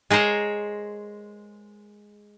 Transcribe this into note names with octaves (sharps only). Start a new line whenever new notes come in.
G#3 G#4 A#4 C5 C#5